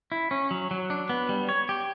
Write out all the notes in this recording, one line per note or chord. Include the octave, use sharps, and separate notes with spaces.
E4
C#4
F#3
F#3
D4
B3
G3
C#5
G4